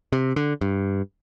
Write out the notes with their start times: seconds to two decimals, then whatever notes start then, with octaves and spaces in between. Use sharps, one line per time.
0.12 C3
0.36 D3
0.61 G2